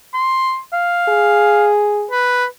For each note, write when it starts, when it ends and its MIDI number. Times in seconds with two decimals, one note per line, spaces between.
0.14 0.59 84
0.73 1.68 77
1.09 2.07 68
2.11 2.45 71